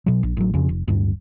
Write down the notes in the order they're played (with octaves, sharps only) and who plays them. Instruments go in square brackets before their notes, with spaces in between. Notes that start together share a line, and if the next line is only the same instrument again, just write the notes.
[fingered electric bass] B2 F#3
A#1
A1 F#3
F2 C#3
F1
D1 G2